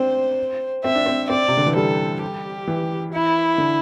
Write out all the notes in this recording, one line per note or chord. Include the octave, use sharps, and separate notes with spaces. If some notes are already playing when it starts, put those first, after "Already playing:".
Already playing: C4 D4 C5
C4 E5
D4
C4
C4 D5
C3
D3
E3
G3 A4
G4
E3
E4
D3